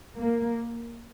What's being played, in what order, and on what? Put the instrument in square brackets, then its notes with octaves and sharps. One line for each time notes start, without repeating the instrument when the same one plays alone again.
[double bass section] A#3